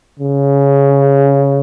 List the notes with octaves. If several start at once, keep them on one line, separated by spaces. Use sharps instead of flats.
C#3